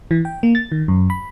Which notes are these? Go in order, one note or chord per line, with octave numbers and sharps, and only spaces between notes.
E3
G5
A#3
A6
D#3
F#2
B5